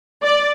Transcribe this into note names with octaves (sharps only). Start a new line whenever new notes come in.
D5